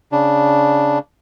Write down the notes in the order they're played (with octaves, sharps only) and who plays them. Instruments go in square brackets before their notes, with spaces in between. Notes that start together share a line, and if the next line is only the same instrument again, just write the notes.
[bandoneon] C#3 D4